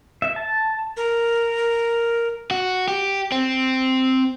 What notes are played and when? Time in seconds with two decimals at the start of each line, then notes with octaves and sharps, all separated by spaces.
0.22 E5
0.36 A5
0.97 A#4
2.51 F#4
2.88 G4
3.32 C4